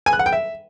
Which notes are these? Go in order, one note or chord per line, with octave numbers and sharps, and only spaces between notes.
G#5
F#6
F#5
G5
E5